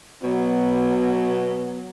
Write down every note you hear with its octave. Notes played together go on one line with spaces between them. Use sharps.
B2 F#3 B3